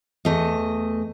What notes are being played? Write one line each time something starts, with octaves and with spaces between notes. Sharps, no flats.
E2 A3 D#5